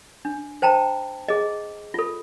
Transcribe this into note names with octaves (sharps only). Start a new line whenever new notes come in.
D4
C5 G5 A5 A#5
G#4 D#5
F4 A4